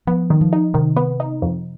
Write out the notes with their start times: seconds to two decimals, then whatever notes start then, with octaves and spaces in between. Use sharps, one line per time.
0.07 F3 B3
0.30 D#3
0.41 F3
0.53 D#4
0.74 C3 D#3
0.97 B3
1.20 D#4
1.42 F2